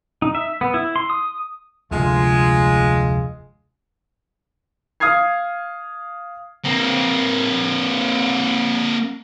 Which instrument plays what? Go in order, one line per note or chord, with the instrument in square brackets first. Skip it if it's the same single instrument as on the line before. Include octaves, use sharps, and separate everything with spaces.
[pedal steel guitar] D#4
E5
B3
E4
C6
D#6
[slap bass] F1 D2 [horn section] G#3 F4
[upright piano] F5 D#6 F6 G#6 C7
[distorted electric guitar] A#3 C4